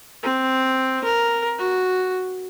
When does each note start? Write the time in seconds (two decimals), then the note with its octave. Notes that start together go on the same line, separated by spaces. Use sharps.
0.23 C4
1.04 A#4
1.58 F#4